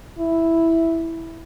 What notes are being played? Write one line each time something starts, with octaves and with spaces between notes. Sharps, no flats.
E4